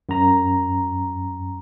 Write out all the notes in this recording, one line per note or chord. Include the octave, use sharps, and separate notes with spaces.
F#2 A#5